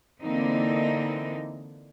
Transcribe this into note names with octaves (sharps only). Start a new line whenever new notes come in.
D3 E3 A#3 C4 D#4